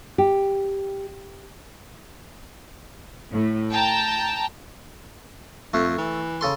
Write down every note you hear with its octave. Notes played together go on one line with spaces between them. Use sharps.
G4
A2
G5 A5 A#5
F2 A3
E3
C#3 A4 C6